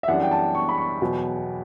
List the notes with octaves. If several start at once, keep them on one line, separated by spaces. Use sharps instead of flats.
E5
F#2 E3 G3 D4 F#5
G5
A5
C#6
B5
C#6
E2 B2 F#3